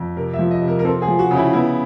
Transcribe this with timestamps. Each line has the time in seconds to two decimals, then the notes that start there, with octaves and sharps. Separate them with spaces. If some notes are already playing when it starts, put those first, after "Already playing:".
Already playing: F2
0.16 C3 A#4
0.34 E5
0.39 F3
0.51 D#5
0.62 C3
0.68 A#4
0.79 A#4
0.85 C4 A4
1.02 G#4
1.08 F3
1.19 F#4
1.31 C#3
1.36 E4
1.53 B3 E4